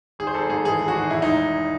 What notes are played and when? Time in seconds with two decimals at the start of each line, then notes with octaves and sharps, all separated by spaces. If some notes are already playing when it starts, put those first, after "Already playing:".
0.19 G#1 G#4
0.27 C5
0.34 G#1 A4
0.49 G#2 G#4
0.65 E3 G#4
0.80 G#1
0.88 F#4
0.95 G#1
1.11 E1 E4
1.22 G#3 D#4